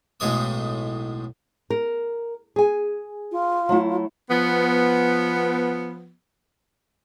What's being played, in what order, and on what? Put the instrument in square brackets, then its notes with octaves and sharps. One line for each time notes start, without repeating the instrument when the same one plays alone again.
[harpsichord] B1 A2 G#3 C#5 D#6
[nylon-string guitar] A#4
G#4 G#5
[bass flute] F4
[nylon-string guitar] F#3 A3 E4
[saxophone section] F3 B3